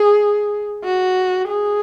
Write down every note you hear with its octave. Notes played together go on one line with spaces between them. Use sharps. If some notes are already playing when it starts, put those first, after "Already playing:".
Already playing: G#4
F#4
G#4